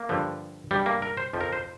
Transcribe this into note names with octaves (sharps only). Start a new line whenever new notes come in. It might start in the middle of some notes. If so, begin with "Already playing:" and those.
Already playing: A#3
G2 D3 F3
G2 G3
A#3
A#4
C5
F2 F3
A#4
C5